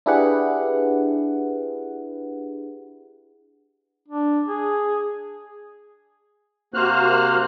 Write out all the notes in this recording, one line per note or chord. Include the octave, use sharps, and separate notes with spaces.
D4 E4 G4 G#4 B4 F#5
D4
G#4
C3 A#3 F#4 C5 F6 F#6